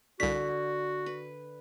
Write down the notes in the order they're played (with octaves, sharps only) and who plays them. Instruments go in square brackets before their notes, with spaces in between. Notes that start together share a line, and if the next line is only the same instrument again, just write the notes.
[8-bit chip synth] C2 B6 [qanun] D3 [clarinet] F#4
[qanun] B4